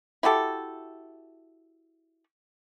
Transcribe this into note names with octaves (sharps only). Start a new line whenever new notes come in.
E4 F#4 G4 A4